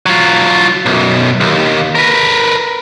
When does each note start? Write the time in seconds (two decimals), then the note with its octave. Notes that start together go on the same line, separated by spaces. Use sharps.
0.06 F#3 F4
0.86 B1 F#2
1.41 D#2
1.95 A#4 B4